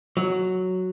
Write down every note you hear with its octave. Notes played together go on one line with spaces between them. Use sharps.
F#3